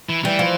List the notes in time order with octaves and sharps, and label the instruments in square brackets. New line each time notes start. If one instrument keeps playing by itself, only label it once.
[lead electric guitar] E3
[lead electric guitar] E3 [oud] G3
[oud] F3